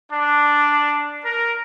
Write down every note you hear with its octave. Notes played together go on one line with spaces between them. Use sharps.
D4
A#4